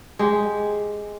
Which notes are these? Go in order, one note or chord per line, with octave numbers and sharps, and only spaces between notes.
G#3 G4